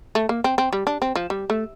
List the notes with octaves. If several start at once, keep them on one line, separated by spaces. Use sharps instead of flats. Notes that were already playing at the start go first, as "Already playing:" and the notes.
A3
A#3
C4
C4
G3
D4
C4
F3
G3
A3